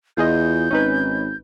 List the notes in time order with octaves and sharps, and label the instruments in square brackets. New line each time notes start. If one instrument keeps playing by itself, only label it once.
[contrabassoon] E2 [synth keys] F4 G#4 D#5 [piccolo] G6
[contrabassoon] G#1 [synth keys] C#4 D#4 B4